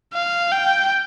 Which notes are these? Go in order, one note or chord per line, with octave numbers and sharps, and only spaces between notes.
F5
G5